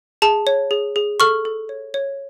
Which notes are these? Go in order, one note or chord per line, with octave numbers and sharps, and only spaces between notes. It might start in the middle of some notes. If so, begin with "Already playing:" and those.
G#4 A5
C#5
G#4
G#4
A4 C#6 F6
A4
C#5
C#5